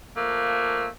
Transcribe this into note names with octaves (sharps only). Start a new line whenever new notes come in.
F3 A3 A#3